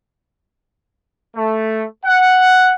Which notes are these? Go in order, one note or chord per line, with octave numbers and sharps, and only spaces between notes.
A3
F#5